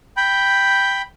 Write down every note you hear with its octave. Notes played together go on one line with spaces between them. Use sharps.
G5 B5 G6